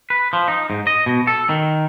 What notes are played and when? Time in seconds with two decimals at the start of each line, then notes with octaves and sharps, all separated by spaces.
0.10 B4
0.33 F3
0.48 D#4
0.70 G#2
0.87 D#5
1.06 B2
1.27 A4
1.49 D#3